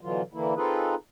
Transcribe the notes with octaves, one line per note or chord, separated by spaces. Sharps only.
B2 D3 E3 F#3 F4
D3 E3 A#3 E4
C4 D#4 F4 G#4 A4 B4